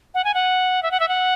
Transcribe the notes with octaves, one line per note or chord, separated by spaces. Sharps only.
F#5
G#5
F#5
E5
F#5
E5
F#5